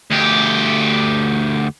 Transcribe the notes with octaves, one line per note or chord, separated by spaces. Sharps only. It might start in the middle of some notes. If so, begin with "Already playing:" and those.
D2 G4